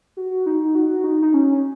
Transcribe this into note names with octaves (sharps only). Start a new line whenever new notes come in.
F#4
D#4
F#4
D#4
D#4
C#4